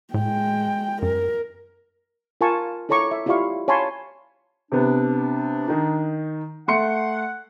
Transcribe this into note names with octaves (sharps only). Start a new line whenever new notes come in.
A2 G#3 G5
F#2 A#4
F4 A#4 F5 G#5 A5 C#6
E4 A4 C#5 A#5 C#6 D6
E5
E4 F4 G4 D5 F5 C#6
C#5 F5 G#5 A5 B5 C6
C3 B3 D4
D#3 D#4
A3 F#5 C6 C#7